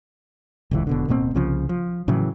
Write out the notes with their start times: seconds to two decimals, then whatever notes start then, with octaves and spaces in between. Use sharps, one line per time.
0.71 D#1 C#2 E3
0.87 E1 B2 D3
1.08 D1 B2 A#3 C4
1.34 C2 C#3 F3
1.69 F3
2.08 A2 C#3 E3 F#3